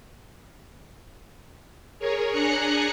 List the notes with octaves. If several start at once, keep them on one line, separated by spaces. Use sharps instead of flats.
G#4 A#4 C#5
D4 G#4 G#5 A#5 F#6 C#7